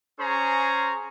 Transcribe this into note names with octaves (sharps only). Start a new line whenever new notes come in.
C#4 G#4 C5 G#5 A#5 C#6